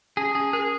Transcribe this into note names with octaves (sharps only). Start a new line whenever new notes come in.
C#4 G#4
C#4 G#4
G#4 A#4